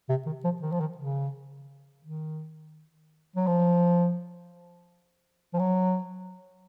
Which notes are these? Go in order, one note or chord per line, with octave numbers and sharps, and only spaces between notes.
C3
D#3
F3
D#3
F3
D#3
C#3
D#3
F#3
F3
F3
F#3